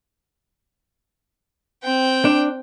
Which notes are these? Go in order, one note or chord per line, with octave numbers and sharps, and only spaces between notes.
C4 G5
D4